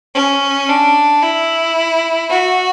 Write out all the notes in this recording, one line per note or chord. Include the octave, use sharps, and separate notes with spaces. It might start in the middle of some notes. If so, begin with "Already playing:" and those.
C#4
D4
E4
F#4